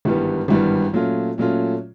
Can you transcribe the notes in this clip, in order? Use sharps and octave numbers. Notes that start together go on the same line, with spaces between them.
G#1 G2 E3 G3 B3
G#1 G2 E3 G3 B3
A#2 F#3 A3 C#4 F4
A#2 F#3 A3 C#4 F4